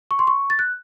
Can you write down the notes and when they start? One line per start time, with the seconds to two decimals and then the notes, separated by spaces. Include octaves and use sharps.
0.11 C#6
0.19 C6
0.27 C#6
0.50 A6
0.59 F#6